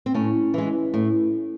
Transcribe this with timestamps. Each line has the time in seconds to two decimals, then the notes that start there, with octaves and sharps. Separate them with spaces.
0.06 C4
0.14 A2 C#4
0.54 E3 G#3
0.94 A2